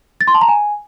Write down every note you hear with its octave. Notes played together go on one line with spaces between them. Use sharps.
A6
C6
A5
A#5
G#5